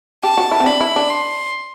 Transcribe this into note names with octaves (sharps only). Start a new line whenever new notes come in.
G4 A5
F#4
E4
C4
D4 B5
E4
D4
C6